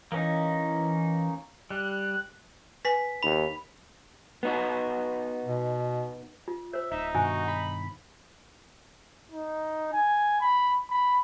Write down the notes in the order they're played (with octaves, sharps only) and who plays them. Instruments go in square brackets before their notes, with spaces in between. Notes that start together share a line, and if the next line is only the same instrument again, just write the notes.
[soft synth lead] E3 [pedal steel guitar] A#3 C#4 D#4
[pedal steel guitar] G3 [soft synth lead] F#6
[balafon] B4 G#5 [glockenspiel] B6
[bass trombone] D#2 [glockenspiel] B5
[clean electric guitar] B3 D#4 F#4
[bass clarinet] B2
[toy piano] F4
[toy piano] C5 C#5 [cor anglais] E5
[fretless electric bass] D1 [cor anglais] D#4 [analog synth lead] E5
[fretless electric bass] G2 B2 D#3 [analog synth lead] F#4 [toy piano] E5 G#5
[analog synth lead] B5
[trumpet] D#4
G#5
B5
B5